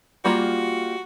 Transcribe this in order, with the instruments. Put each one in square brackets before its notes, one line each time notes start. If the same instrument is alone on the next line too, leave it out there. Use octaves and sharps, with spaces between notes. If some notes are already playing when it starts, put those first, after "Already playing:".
[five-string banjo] G3 A#3 F4 [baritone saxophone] F#4